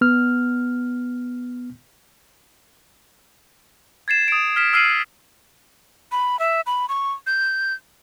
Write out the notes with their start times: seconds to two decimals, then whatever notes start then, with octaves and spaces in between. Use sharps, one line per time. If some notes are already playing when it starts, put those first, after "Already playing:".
0.01 B3 F6
4.08 G#6 A6 C7 E7
4.28 D#6 D7
4.56 F6 B6 E7
4.73 E6 F6 C7 D#7 F#7
6.12 B5
6.39 E5
6.66 B5
6.89 C#6
7.27 G6